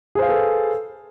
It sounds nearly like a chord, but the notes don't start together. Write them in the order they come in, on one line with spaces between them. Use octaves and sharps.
G#4 C5 F5 B4 A4